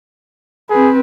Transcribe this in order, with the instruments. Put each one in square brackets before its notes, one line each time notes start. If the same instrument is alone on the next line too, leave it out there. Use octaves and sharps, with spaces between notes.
[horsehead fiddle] C4 B4 [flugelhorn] G#4